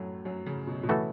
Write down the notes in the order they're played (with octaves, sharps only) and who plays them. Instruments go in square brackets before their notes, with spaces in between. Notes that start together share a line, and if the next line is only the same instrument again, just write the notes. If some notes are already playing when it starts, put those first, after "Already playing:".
Already playing: [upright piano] F#2 A2 F#3 A3
F#2 F#3
C#3
B2
B2
[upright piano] C#3 [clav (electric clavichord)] E3 A3 F#4 A4